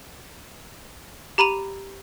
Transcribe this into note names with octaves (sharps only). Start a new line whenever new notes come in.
G4 A#5 B5 D#7 F7